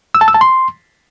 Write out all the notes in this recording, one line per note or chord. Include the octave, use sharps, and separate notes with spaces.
E6
A5
E6
A5
C6